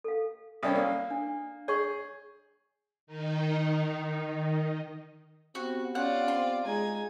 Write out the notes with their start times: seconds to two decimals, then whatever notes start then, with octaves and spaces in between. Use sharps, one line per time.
0.04 A4 F5
0.63 C2 C#4 D5 D#6
0.75 A#3
1.10 D4
1.68 G#4 C#5 C#6
3.07 D#3 D#4
5.55 B3 C4 F#4 G4
5.95 C#4 F4 D5 F#5
6.28 C4 C6
6.65 G#3 D#4 F4 G#4 G#5